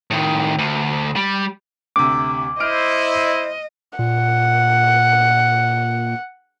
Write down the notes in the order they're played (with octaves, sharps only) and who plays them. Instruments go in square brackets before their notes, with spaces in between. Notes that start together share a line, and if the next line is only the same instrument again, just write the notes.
[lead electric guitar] A2 D#3
D2
G3
[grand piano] D2 C3 [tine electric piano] D6
[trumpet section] E4 C5 [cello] D#5 [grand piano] F6 D7
[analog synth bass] A#2 [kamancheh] F#5